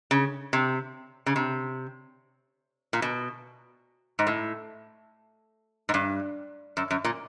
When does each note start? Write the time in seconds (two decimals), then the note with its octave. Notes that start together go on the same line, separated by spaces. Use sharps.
0.11 C#3
0.53 C3
1.26 C#3
1.36 C3
2.93 A#2
3.02 B2
4.19 G#2
4.27 A2
5.89 G#2
5.94 G2
6.77 F#2
6.91 F#2
7.05 A#2